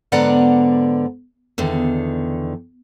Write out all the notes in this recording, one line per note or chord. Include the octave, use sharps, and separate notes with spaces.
G#2 D3 B3 D5 F#5 A#5
E2 D3 D#3